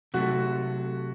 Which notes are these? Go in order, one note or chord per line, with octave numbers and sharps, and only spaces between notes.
C3 F#3 A3 F#4